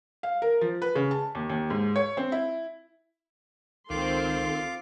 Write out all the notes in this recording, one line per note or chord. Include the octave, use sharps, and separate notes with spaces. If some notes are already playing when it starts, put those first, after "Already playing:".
F5
A#4
F3
B4
C#3
A5
D#2
D#2
G#2
C#5
C4
E4
C#2 D#3 C4 F4 A4 F5 C6 D6